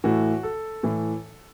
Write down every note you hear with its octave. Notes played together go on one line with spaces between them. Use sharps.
A2 E3 F#4
A4
A2 E3